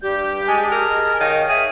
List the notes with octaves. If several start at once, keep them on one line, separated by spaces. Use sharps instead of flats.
G2 G3 G4 G6
G#3 G#4 G#5 A5
A#4
D#5
D#3 C#5 F5 G5
G#4 E5